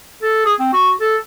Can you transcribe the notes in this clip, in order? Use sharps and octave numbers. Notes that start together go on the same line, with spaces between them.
A4
G#4
C4
F#4
A4